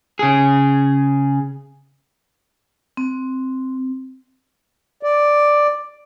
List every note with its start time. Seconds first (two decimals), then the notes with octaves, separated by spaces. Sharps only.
0.19 C#3 G#4
2.97 C4
5.03 D5